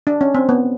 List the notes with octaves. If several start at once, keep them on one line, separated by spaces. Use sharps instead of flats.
D4
C#4
C4
B3